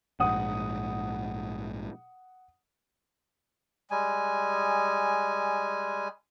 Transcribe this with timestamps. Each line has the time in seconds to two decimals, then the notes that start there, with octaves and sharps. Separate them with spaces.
0.20 A#1 G#2 F#5 D#6
3.91 G3 G#3 G#5